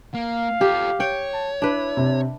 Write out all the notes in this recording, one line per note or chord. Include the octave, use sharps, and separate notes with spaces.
A#3 F5
F4 G4 A4
C#5 G5
A5
D4 E4 B4
C3